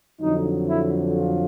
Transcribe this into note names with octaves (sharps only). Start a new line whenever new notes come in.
F2 D3 F#3 D#4
E4
F4